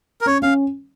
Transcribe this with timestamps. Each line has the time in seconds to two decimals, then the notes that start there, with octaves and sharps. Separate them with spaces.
0.21 A#4
0.26 C#4 C#5
0.42 C#4 F5